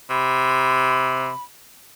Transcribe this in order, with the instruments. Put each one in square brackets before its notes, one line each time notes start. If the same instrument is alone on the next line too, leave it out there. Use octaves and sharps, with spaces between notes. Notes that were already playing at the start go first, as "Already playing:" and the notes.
[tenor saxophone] C3 [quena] B5